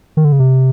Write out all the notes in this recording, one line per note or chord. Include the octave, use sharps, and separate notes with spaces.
D#3
D3
C#3
C3